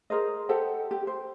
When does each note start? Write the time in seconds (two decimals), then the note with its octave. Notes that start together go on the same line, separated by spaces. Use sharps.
0.10 G#4 A#4 C5 D#5
0.49 G4 A4 C5 F#5
0.91 G4
1.07 C5